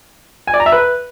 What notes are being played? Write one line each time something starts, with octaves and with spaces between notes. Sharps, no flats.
G#5
D5
A#5
E5
B4